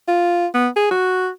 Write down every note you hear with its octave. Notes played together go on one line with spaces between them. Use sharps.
F4
B3
G#4
F#4